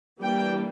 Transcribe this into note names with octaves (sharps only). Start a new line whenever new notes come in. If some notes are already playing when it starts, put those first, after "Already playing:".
E3 G3 A#3 D4 G5